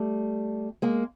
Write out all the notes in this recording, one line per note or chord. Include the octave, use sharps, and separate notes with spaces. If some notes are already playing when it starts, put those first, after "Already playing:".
Already playing: G3 A3
G#3 A#3